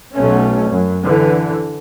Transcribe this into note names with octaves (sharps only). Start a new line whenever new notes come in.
B1 A3 C#4
F#2
D3 E3